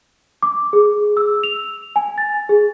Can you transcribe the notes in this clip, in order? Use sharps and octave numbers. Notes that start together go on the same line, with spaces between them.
D6
G#4
E6
F7
G#5
A6
G#4